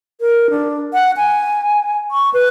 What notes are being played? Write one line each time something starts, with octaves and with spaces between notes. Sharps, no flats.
A#4
D4
F#5
G#5
C#6
B4